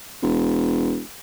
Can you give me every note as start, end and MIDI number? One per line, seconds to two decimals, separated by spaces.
0.22 0.99 28